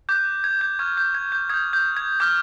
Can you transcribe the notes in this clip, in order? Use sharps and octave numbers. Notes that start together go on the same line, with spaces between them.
D6 F#6 G6
G#6
G6
C#6 F6 G#6
G6
G#6
G6
D#6 G6 G#6
G6
G#6
D6 F6 G6